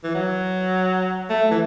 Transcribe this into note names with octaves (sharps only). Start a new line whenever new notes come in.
E3
F#3
A3
E3